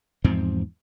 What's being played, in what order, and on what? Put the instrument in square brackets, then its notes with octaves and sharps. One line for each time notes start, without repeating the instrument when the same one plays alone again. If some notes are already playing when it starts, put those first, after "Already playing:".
[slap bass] E2 G#2 F3 C4